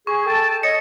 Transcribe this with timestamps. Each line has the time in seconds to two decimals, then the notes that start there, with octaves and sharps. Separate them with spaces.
0.07 G#4 C#6
0.26 A4 G5 A5
0.63 C#5 D#5 C#7